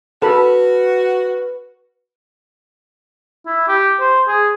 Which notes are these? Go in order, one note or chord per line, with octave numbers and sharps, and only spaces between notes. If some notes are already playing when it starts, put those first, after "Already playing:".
F#4 A4 B4 B5
E4
G4
C5
G#4